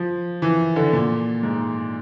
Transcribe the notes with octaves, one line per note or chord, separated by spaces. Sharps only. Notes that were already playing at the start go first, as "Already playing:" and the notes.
Already playing: F3
E3
D3
A#2
G#2